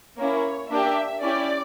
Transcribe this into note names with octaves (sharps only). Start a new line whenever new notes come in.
A#3 C#4 E4 C#5
A#3 D4 G4 E5
C#4 E4 G4 D5